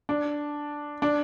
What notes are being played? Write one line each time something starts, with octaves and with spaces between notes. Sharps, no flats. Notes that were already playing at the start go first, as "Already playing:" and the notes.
D4
D4